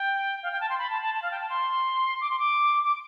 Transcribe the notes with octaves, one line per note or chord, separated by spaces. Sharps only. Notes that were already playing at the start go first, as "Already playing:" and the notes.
Already playing: G5
F5
G5
A5
C6
B5
A5
A5
A5
F5
G5
A5
C6
D6
C6
D6
D6